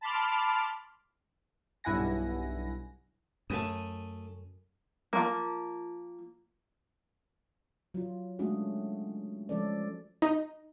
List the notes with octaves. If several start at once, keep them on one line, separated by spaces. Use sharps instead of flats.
A5 B5 C6 D6 F6
B1 G2 E4 F#5 G#5 A#6
F#2 A3 G#5 D#6
F3 A#3
F#3 F4
G#3 A3 C#4 D4 F#4 G#4
F3 G#3 C#4 A4 D5
D#4